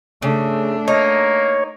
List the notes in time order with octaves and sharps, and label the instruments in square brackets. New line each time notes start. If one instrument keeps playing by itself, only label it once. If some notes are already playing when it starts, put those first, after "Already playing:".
[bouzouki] C#3 [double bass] A3 D4
[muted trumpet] A#3 [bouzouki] D#4 [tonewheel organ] C#5